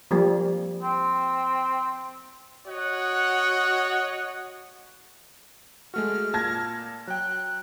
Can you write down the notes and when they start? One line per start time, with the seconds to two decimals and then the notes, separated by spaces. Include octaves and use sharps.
0.11 F3 G3 A#3
0.83 C4
2.67 F#4 C#5 D#5 F#5
5.94 G#3 A3 F#4 F6
6.34 A#2 A5 G#6 A#6
7.07 F#3 G5 F#6